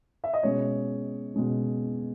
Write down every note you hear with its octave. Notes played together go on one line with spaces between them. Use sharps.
E5
D#5
B2 G#3 C#4 C#5
B2 G#3 C#4